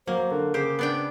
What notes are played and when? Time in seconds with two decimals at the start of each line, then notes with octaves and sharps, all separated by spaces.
0.07 F#3 A#3 C5
0.31 D3 A#4
0.54 C#3 G4 C5
0.79 B3 D4 G5